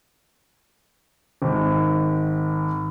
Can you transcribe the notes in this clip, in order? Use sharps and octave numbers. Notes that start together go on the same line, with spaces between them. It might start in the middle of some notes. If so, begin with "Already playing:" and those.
G#1